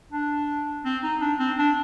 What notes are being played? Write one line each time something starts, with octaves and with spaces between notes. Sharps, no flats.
D4
C4
D#4
D4
C4
D4